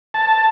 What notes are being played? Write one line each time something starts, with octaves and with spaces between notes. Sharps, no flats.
A5